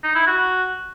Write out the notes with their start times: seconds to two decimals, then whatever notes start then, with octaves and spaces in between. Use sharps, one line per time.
0.03 D#4
0.15 E4
0.26 F#4